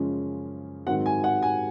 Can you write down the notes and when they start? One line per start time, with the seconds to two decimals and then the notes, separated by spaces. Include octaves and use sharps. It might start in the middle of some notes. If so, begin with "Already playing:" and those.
Already playing: F#2 C#3 F3 G#3 C#4
0.87 G#2 D#3 F#3 C4 F#5
1.06 G#5
1.24 F#5
1.42 G#5